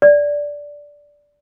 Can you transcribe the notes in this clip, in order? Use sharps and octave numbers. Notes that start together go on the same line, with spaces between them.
D5